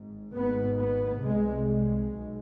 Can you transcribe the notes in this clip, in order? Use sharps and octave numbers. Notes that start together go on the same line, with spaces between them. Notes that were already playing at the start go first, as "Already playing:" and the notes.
Already playing: G#1 G#2
G#1 G#2 B3
B3
C2 C3 G#3
G#3
B1 B2